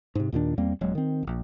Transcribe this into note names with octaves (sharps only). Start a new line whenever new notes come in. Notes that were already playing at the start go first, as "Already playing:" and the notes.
G#2 C3
D#2 A#2 D#3 D4
E2 G3 A#3 C4
D#1 F#3 G#3
D#3 C4
D1 A#1